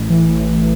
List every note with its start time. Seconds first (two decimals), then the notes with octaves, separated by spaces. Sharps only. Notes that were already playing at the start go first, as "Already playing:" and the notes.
Already playing: A1
0.09 E3
0.29 A2
0.47 A1